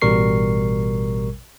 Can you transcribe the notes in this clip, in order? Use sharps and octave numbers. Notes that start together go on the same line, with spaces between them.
A1 B2 G3 A#4 C#6 C7